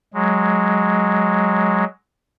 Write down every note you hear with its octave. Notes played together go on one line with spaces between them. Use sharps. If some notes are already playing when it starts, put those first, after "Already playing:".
F#3 G#3